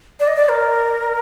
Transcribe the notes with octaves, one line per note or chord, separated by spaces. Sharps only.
D5
D#5
D5
A#4